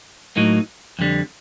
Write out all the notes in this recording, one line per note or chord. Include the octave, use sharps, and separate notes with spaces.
A2 F#3 A#3 D#4
F2 D3 G3